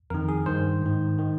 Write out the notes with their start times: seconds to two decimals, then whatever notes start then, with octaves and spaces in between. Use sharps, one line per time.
0.10 F2 D#3 A#4
0.29 G#4
0.46 G2 D#3 C5
0.82 G#2 D#3
1.18 D#3